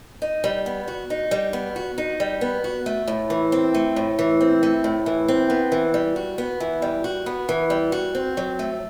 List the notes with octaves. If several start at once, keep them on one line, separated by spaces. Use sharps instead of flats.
D#4
G3
B3
F#4
D#4
G3
B3
F#4
D#4
G3
B3
F#4
A3
A2
E3
C4
A3
A2
E3
C4
A3
A2
E3
C4
B3
E3
G3
F#4
B3
E3
G3
F#4
B3
E3
G3
F#4
C4
F#3
A3